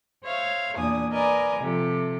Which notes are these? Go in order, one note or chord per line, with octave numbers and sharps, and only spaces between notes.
C5 C#5 E5 F5
E2 A#2 D4 G#5 D#6
A#4 B4 D5 D#5 G#5 A#5
C3 F3 G4 A4